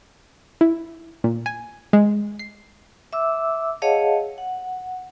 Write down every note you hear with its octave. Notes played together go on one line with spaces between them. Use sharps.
E4
A#2
G#5
G#3
C7
E5 D6 E6
G#4 C#5 D#5 F5 F#5 A5
F#5